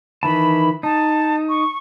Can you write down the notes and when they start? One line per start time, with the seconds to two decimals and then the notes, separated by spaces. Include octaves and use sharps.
0.23 D#3 E3 A5 B5
0.83 D#4 A5
1.49 C#6